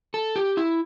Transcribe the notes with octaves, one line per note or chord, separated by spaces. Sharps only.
A4
G4
E4